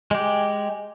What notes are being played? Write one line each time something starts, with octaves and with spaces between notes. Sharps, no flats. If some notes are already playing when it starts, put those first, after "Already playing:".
G#3 G4